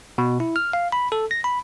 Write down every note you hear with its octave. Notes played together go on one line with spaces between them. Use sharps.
B2
E4
F6
F5
B5
A4
A#6
B5